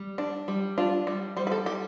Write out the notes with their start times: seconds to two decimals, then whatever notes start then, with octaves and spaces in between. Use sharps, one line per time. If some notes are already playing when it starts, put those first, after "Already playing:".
Already playing: G3
0.18 D4
0.48 G3
0.78 D4 F4
1.07 G3
1.37 G3 C5
1.47 B4
1.52 A4
1.66 G3 G4